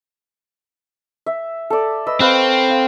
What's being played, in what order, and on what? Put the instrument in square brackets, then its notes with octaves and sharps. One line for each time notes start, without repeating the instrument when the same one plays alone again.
[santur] E5
A4 D5
B4 D#5 E6
[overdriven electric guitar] C4 [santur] B4 F5 C#6
[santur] F5